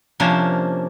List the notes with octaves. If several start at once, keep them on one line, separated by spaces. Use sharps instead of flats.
C3 F3 A#3 C#4 D4